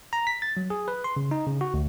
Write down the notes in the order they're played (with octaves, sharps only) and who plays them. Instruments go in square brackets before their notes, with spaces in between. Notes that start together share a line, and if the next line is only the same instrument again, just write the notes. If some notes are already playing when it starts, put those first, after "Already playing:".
[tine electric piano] A#5
B6
A6
F#3
G#4
B4
C6
C#3
D#4
C#3
F#4
D2